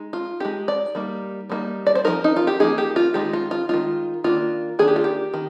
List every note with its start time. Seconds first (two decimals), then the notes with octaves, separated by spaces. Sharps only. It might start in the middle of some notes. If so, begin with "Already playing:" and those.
Already playing: G#3 D#4
0.13 F4
0.40 G#3 D#4 G4
0.68 D5
0.95 G3 A#3 D#4
1.49 G3 A#3 D#4
1.87 D5
1.95 C5
2.04 F3 A#3 D#4 A#4
2.24 D#4
2.36 F4
2.47 G4
2.60 F3 A#3 D#4 G#4
2.78 G4
2.96 F4
3.14 D#3 G#3 D#4 G4
3.33 F4
3.51 F4
3.69 D#3 G#3 D#4 F4
4.24 D#3 A#3 D4 F4
4.79 D#3 A#3 D4 G#4
4.88 G4
4.96 F4
5.04 G4
5.34 D#3